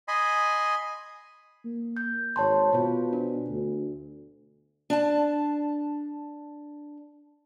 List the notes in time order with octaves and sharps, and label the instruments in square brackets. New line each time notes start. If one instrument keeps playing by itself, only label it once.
[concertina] D#5 G#5 B5 C6
[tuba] A#3
[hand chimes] G6
[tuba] G#1 [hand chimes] C#5 A5 C6
[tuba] B2 [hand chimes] F4 C5
[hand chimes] D4
[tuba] D2
[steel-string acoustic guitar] D4 A5